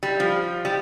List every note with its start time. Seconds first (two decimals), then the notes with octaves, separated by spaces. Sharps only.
0.03 G3
0.20 F3
0.65 G3